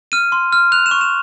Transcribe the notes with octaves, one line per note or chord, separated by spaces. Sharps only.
F6 D#7
C6
F6
F#6 F7
E7
C#6
E7